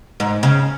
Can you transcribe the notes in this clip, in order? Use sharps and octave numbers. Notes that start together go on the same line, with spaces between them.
G#2
C#3